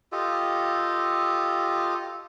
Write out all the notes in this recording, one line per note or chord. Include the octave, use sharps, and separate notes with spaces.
F4 G4 A4 D#5